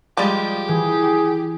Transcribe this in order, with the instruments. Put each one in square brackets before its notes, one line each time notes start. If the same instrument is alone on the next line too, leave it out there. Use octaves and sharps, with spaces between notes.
[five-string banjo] F3 G3 G#3 [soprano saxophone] G4
[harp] E3 [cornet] G#4